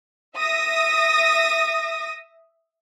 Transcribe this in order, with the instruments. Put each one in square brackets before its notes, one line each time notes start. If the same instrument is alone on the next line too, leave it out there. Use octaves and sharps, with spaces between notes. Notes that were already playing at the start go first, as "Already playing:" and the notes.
[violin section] E5 D#6 A#6